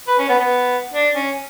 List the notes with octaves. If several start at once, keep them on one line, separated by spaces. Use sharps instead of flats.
B4
C#4
B3
B3
D4
C#4